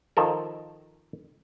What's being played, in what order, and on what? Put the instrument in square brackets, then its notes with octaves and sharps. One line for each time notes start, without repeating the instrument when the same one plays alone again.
[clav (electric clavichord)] D#3 F3 A4 A#4